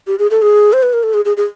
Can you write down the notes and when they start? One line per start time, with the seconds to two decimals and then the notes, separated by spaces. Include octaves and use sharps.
0.07 G4
0.19 G#4
0.31 A4
0.42 G#4
0.73 C5
0.83 B4
0.93 A#4
1.03 A4
1.14 G#4
1.25 G#4
1.37 G#4